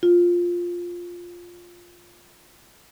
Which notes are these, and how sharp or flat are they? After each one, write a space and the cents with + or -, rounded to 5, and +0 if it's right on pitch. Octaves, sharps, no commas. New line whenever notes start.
F4 +5